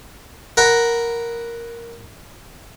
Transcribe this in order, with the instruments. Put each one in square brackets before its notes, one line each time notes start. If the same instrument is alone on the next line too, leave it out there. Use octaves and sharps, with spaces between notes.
[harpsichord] A#4 F#5 B5